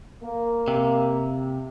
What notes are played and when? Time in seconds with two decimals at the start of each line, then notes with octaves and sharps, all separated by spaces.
0.23 A#3
0.68 C3